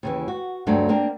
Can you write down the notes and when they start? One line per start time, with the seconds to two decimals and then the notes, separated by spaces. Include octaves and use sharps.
0.03 D#2 C#3 E3
0.28 F#4
0.67 D2 G2 F#3 A3 D4
0.89 A#3 C4 D4 A#4